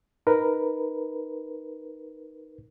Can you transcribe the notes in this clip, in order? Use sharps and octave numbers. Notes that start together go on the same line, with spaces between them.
D#4 A#4 B4